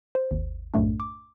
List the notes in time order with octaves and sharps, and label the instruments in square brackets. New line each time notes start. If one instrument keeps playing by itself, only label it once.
[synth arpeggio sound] C5
G#1 D#2
B1 F#2 A2 A3 D4
D6